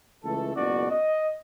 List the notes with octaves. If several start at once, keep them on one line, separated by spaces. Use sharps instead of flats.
C#2 E3 A3 A4
F#1 C#2 B2 F#4 D5
D#5